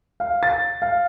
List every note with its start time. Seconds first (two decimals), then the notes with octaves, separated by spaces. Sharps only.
0.20 F5
0.43 A6
0.82 F5